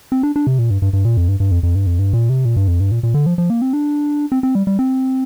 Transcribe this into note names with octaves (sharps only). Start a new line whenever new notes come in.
C4
D4
D4
C3
A#2
G2
G2
G2
A#2
F2
G2
G2
F2
F2
G2
F2
G2
A#2
C3
A#2
G2
F2
G2
A#2
A#2
D3
F3
F3
A#3
C4
D4
C4
C4
G3
G3
C4